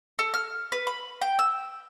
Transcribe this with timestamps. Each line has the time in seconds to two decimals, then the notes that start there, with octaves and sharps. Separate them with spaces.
0.19 A4
0.34 F6
0.72 B4
0.87 B5
1.21 G5
1.39 E6